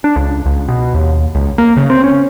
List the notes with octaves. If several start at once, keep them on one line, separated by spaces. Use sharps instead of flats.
D4
C#2
C#2
B2
D#2
C#2
A#3
C#3
C4
C#4